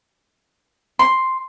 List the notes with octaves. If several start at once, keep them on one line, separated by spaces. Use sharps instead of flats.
C6